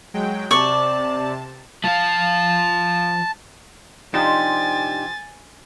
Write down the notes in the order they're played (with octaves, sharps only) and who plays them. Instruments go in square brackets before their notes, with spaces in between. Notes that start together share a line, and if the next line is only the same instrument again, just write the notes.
[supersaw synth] F#3 G#3 G5
[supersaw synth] C3 A5 [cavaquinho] D5 C#6
[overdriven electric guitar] F3 F5 [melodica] A5
[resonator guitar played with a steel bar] C3 F3 [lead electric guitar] D4 G4 [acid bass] D#4 [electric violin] G#5 A6